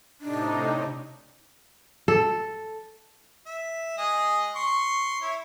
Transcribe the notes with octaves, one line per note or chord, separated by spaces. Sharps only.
A2 C3 D4 D#4
A4
E5
G#3 G#4 D#5
C6 C#6
E4 C#5